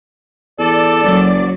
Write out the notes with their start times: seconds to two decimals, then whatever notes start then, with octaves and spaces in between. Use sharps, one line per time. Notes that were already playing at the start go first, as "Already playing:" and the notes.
0.59 E2 A4 D5
1.04 F#1 F#3